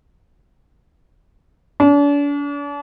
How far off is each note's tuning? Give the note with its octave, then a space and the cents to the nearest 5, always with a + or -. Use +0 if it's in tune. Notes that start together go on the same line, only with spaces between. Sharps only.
D4 -40